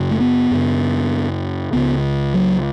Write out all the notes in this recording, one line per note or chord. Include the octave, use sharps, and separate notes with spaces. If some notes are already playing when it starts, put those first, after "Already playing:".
Already playing: F#2 C#3
A3
B3
F#2 C#3
C#2 C#3 B3
F#3